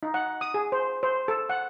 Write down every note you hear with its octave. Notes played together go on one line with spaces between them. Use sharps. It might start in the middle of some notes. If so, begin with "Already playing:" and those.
D#4
F#5
D#6
G#4
C5
C5
A4
F#5